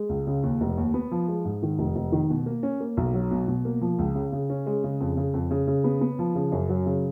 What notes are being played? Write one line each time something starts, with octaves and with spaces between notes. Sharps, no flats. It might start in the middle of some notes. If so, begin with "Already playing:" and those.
Already playing: G#3
C#2
C#3
D#2
F1
D#2
B3
F3
G#3
G#2
D#3
F1
F1
D#3
B2
A#3
C#4
A#3
B1
F#3
B2
B2
A#3
F3
C#2
C#3
C#3
C#4
G#3
C#3
F2
C#3
F2
C#3
C#3
B3
B3
F3
C#3
F#2
F#3
C#3